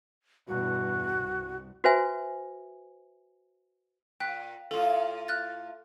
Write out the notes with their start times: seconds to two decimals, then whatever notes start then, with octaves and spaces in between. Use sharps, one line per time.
0.48 E2 G2 B2 F#4
1.19 C2
1.84 F#4 B4 C5 E5 G#5
4.20 A#2 G5 F#6 B6
4.71 A2 F4 A4
5.28 F6 F#6 A6